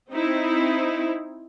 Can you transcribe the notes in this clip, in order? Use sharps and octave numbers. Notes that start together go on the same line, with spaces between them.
C4 D#4 E4